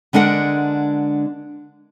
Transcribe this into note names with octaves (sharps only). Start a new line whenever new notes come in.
D3 G#3 D4 A#4 F#5